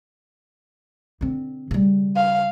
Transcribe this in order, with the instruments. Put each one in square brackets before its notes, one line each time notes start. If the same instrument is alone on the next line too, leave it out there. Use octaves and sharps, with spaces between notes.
[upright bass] D3 C4
C#3 G3
[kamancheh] F5